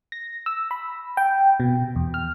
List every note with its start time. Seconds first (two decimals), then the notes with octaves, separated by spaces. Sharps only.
0.12 A#6
0.46 E6
0.71 B5
1.17 G5
1.60 B2
1.96 E2
2.14 F6